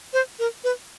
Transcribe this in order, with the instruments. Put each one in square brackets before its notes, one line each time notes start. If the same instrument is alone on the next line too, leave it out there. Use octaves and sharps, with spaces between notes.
[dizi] C5
A#4
B4